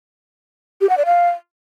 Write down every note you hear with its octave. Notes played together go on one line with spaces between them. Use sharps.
G4
F#5
D5
F5